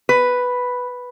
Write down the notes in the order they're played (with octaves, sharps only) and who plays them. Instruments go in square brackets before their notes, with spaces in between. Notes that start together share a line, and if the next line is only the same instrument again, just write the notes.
[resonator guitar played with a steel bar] B4